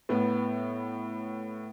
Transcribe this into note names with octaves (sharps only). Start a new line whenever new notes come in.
A2 B3